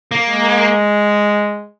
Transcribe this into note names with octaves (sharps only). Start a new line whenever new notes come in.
A#3
G#3